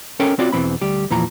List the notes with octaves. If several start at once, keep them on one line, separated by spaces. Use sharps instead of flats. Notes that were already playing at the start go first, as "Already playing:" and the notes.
C#4 A4 A#4 C#5 G5
C4 F4 F#4 C#5 D5
E2 B2 E3 C4 B5
D2 G3 G4
E2 A#2 E3 F3 A#5